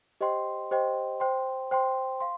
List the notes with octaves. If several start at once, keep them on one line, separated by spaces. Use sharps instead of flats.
G4 C5 D#5 G5 C6
G4 C5 D#5 G5 C6
C5 G5 C6
C5 G5 C6
F5 C6